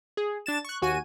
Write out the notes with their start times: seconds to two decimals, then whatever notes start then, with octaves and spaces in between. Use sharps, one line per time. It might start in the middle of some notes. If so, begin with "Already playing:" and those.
0.17 G#4
0.46 D4 A6 E7
0.65 C#6 F#6
0.82 D#2 F#4 G#5 D#7